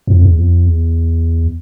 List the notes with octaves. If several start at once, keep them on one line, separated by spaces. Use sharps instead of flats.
F2
E2
F2
E2